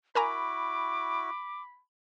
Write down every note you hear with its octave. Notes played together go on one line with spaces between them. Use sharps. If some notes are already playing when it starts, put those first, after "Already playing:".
E4 F#4 A#4 G#5 A#5 B5 D6